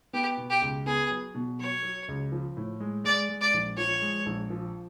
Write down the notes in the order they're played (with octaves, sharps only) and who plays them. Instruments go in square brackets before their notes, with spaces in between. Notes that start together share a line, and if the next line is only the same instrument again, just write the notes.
[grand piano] B3 [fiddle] G4
[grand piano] B2
[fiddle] G4
[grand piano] C#2
[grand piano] B3 [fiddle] G#4
[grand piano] F#3
B2
[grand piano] F#3 [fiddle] C#5
[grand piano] F#3
C#2
F3
A2
G#3
[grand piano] G#3 [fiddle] D5
[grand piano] G#3
[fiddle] D5
[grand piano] A#1
[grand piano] F3 [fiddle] C#5
[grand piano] G#3
A#1
F3